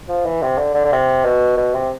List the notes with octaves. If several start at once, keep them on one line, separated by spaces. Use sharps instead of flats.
F3
E3
C3
D3
D3
D3
C3
B2
B2
C3